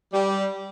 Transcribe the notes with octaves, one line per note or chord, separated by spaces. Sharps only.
G3